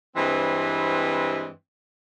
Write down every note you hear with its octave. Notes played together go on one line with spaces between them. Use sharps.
G2 E3 G#3 C4